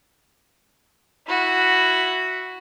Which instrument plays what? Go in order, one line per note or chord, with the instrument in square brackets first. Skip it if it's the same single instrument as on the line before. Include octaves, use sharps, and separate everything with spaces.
[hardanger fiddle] E4 F#4